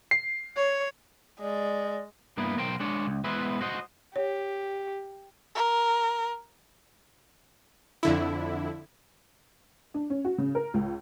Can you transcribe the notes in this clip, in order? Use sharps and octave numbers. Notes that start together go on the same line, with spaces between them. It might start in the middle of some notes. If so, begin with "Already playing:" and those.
C7
C#5
G#3 D5
G2 A#3 B3 E4
B1 A#4 C5 G5
G#3 D4 C#5
C#2
G#3 B3 E4 B4 C5 E5
F#4 C5 D#5
G4 C#5
A#4
F2 D3 E4
D4
C#4
F#4
C#3
A#4
C#2